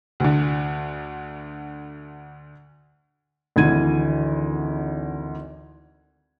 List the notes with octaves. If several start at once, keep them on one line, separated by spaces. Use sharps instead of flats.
D2 D3
G#1 D2 E3 G#6 D#7